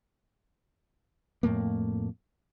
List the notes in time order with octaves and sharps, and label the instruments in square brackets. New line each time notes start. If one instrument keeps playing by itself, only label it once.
[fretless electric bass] F2 A2 A3 A#3